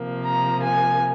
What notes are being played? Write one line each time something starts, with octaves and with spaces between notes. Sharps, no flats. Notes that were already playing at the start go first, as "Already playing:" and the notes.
Already playing: C3 F3 A#3
A#5
G#5